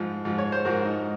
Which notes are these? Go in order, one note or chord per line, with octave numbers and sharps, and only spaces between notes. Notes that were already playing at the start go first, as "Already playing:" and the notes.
Already playing: G#2 F3
G#2 F3
C#5
C5
G#2 F3 F#4 A#4
D#4